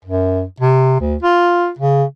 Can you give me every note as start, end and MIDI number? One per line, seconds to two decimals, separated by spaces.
0.05 0.43 42
0.60 0.99 48
1.00 1.15 38
1.23 1.70 65
1.79 2.04 49